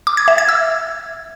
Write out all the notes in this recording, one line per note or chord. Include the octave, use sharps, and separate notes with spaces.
D6
G#6
E5
G#6
E6